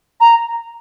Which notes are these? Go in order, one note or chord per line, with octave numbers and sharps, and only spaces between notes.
A#5